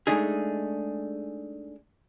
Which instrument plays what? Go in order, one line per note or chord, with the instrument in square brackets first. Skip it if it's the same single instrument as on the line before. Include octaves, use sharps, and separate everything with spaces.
[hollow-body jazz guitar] G#3 A3 D4 D#4 G#4